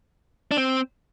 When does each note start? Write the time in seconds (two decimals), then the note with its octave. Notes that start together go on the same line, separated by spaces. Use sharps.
0.51 D4
0.57 C4